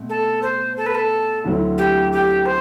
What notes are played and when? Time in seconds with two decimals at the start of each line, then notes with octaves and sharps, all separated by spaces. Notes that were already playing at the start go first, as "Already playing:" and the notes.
Already playing: B2 A3 C4
0.09 A4
0.42 C5
0.77 A4
0.86 B4
0.95 A4
1.44 D2 D3 F#3 C4 E4
1.78 G4
2.12 G4
2.46 C5